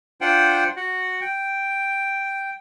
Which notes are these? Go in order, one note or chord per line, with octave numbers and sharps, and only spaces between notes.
D4 F4 C5 F#5 G5
F#4 F#5
G5